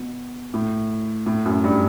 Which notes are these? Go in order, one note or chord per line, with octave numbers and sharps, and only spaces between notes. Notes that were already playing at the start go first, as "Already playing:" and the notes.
Already playing: B2
A2
A2
F#2
G2